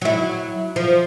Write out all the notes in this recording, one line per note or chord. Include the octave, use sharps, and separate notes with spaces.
F#3 E4
F3